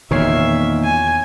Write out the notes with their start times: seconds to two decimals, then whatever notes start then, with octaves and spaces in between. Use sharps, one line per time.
0.11 E2 A#2 D#3 C#5 E5 C7
0.84 G#5